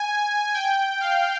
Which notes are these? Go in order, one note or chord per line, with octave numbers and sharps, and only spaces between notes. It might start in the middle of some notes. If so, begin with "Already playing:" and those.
Already playing: G#5
G5
F5